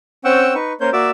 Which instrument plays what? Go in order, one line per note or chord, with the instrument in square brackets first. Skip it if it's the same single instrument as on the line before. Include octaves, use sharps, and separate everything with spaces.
[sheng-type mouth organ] C4 C#4 F#5 G5 C#6 E6
D#4 B4 C#6
A#3 C#4 A#4 C5 C#5 G6
A#3 F#4 D5 E5 D6 E6